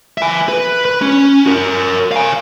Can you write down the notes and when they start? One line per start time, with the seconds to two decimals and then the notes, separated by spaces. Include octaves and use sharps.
0.18 E5 G#5
0.49 B4
0.85 B4
1.01 C#4
1.46 F#4 A#4
2.12 F5 G#5